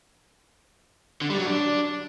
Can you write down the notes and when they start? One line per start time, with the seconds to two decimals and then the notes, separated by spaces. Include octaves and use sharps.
1.21 D3
1.30 G3
1.38 F#3
1.46 D4